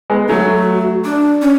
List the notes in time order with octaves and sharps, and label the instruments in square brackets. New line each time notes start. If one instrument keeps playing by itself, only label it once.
[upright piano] G#3 B3
[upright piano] F#3 A3 [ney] F#4
[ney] D4
C#4